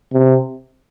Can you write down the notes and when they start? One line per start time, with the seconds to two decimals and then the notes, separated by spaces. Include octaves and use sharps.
0.13 C3